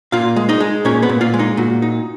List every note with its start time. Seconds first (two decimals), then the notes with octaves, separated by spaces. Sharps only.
0.12 A#2 F4 F5
0.36 G#3
0.49 D#4 D#5
0.60 G#3
0.85 A#2 C#4 C#5
1.02 B3 B4
1.09 A#2
1.21 F4 F5
1.34 G#3
1.39 D#4 D#5
1.57 A#2 F#4
1.82 D#4